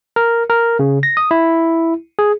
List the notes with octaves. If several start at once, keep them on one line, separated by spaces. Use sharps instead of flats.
A#4
A#4
C#3
A#6
D#6
E4
G#4